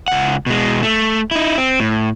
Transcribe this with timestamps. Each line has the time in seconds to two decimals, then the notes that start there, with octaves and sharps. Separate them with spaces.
0.08 C#2 F#5
0.46 B2 G#3
0.83 A3
1.31 D#4 E4
1.58 C4
1.80 A2